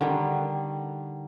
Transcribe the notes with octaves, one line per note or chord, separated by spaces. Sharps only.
D3 D#3 G3